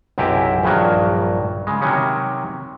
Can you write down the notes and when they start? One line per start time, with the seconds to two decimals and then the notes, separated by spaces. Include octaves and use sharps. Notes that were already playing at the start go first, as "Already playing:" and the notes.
0.18 B1 F#2 C3 E4 G4 D#5
0.63 A#1 G2 D#3 F#3 A#3
1.67 C#3 G#3
1.82 C3 D#3 F#3 C#4